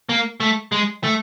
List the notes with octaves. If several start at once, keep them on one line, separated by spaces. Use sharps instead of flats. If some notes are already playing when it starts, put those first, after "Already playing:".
A#3
A3
G#3
A3